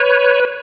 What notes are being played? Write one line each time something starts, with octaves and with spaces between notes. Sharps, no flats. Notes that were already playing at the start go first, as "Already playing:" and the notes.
Already playing: B4 C#5